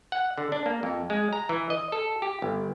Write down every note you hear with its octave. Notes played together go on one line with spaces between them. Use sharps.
F#5
D3
D4
A#3
F2
G#3
A#5
E3
D#5
A4
G4
G1